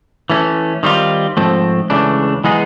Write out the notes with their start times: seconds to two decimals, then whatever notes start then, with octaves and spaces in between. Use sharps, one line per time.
0.30 E3 A3 C#4
0.83 D#3 G3 C4 F4
1.37 G#2 F3 A3 C4
1.90 C#2 C#3 E3 A3 D4
2.44 E3 G#3 B3 D#4 G#4